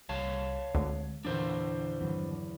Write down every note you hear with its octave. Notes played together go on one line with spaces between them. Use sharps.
C2 G3 C#5 F5 A5 C#6
D2 D3 G#3 C4
E2 A#2 D3 E3 D4 C5
E2 G2 D#3 F#3 C4